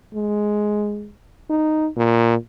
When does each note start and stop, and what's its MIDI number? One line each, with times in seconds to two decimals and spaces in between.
0.14 1.10 56
1.50 1.88 63
1.96 2.35 46